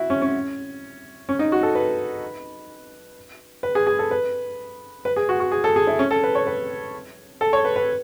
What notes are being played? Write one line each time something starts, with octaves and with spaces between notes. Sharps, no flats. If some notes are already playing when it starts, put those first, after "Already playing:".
Already playing: E4 F#4
C#4
C#4
C#4
D#4
F#4
A4
B4
B4
G#4
G#4
A4
B4
B4
G#4
F#4
F#4
G#4
A4
G#4
E4
C#4
A4
B4
C#5
B4
A4
C#5
B4
B4